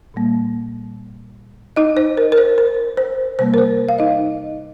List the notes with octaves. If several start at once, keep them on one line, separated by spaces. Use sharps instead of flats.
A#2 G3 A#3
D#4 D#5
C5
A#4
A#4
C5
A#4
C5
C3 G3 A#3 C5
A#4
C5
F5
D#4 D#5